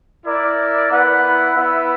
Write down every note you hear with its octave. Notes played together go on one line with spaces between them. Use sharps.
E4 A#4 D5
B3 E4 B4 F#5
B3 E4 B4 E5